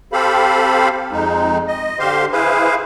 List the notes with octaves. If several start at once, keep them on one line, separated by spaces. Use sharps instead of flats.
C4 G4 A4 C5 F5 B5
F2 G#3 D#4
D#5
D3 G4 C5 F5 C6
E4 G#4 B4 C5 F5